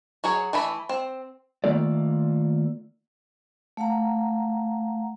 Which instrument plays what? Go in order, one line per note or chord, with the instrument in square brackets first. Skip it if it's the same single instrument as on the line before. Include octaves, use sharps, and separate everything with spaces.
[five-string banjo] F#3 F#4 G#4 C#5
E3 A3 E4 B5
C4
[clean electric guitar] D#3 A3 A#3 F4 A4 D5
[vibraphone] A3 F5 F#5 A#5